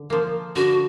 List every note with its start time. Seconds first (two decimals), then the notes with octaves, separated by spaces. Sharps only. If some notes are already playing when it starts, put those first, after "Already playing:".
Already playing: D3
0.10 F3 A#3
0.55 D3 F#4